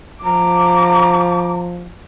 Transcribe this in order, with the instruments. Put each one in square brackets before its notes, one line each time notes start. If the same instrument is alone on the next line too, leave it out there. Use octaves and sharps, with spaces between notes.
[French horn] F3 [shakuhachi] A#5 [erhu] D6